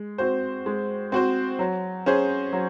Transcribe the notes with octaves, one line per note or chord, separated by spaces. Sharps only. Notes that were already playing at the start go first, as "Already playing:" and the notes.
Already playing: G#3
C4 F#4 C5
G#3
C4 F#4 C5
F#3
C#4 G#4 C5
F#3